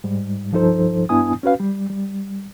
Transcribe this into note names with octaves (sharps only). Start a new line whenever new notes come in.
G#2 G3
C2 G2 F3 D#4 A4 C5
G2 B3 D4 E4 G#5 D#6
C#4 F#4 B4 F5
G3
G3